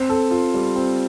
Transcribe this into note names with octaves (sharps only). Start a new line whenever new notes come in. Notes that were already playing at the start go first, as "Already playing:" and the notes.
Already playing: C4
A4
F4
G3
C4